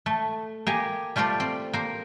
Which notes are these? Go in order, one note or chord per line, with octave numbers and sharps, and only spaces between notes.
A3
A#3 G4 G#5
G3 A3 F4 C5 D5
C4
A#3 C5